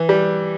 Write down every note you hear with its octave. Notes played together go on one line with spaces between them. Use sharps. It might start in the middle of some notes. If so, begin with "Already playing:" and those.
Already playing: E3
G3